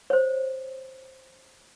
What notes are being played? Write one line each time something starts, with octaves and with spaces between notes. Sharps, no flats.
C5 C#5